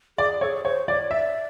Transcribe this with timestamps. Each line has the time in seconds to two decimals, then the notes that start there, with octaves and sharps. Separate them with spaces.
0.18 G#4 D5
0.41 A4 C#5
0.47 G#4
0.64 C5 C#5
0.88 C#5 D5
1.11 D5 E5